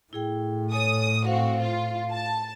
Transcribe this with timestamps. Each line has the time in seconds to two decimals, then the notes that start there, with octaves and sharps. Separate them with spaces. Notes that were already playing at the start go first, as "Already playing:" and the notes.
0.13 A2 E4 G#4 G5
0.72 A4 C#5 G#5 D#6
1.27 C4 F#4 F5
1.60 F4
2.11 A5